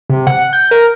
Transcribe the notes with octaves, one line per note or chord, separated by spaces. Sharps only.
C3
F#5
G6
A#4